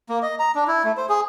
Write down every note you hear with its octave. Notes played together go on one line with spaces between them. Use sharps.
A#3
D#5
A#5
D4
E4
A3
C5
G#4